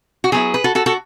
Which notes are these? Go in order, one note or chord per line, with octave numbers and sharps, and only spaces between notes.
F#4
F#3 B3 E4 G#4
B4
F#4 A4
F#4 A4
F#4 A4